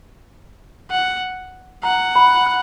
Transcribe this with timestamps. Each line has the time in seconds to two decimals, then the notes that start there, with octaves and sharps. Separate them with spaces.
0.91 F#5
1.83 F#5 A#5
2.16 B5
2.46 F#6